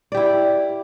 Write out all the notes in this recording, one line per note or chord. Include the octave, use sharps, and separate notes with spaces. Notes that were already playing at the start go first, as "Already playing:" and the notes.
E4 G4 D5